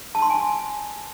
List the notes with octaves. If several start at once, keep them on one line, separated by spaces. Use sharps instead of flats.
A5
C6
G#5